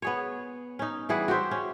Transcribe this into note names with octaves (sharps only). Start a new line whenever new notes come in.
B3 G#4 C#5
C#4 D#4
E3 G3 G#4 F#5
F#4 G4 C5 E5
C#4